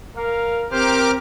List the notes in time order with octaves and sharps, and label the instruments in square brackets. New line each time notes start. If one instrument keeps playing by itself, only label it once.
[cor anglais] A#4 [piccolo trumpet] F5
[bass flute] C4 [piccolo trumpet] G4 [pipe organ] A#4 D6 F6 [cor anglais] C5